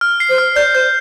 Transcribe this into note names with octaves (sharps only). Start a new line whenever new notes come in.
F6
C7
C5
F6
D5 G6
C5 G6